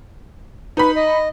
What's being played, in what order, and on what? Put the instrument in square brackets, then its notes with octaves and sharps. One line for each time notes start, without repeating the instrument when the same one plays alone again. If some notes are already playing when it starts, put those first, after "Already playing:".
[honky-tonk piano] D#4 B5 [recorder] B4
[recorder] D#5